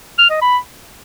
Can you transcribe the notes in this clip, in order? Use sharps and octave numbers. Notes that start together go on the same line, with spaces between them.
F6
D#5
B5